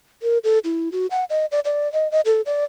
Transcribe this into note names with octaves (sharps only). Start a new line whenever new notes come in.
A#4
A4
E4
F#4
F#5
D#5
D5
D5
D#5
D#5
A4
D5